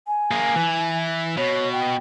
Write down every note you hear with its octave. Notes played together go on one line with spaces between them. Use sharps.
G#5
A#3 G#4
E3
B2 C#5
G5